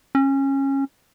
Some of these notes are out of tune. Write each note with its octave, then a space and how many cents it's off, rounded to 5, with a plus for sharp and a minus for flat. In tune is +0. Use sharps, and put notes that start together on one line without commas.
C#4 -20